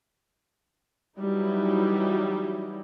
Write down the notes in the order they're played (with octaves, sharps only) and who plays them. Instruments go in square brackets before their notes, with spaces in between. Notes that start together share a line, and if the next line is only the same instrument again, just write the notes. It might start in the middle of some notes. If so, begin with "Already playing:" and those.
[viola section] E3 F#3 G3 D#4 E4